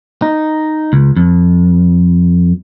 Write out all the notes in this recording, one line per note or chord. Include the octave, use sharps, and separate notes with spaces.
D#4
C#2
F2